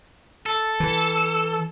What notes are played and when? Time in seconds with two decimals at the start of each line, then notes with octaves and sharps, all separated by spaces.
0.46 A4
0.80 E3